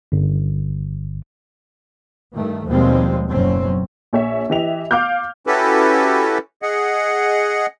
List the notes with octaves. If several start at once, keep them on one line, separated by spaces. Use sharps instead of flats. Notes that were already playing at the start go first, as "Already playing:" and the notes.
G1
G2 D#3 A3
D#2 B2 F3 G3 G#3 C4
F#1 F#2 B2 F#3 C4 C#4
A#1 C#5 E5
E3 G4 D#5 E5 F7
F5 D6 F6 G6
C#4 E4 F#4 G4 A4 B4
G#4 D#5 F#5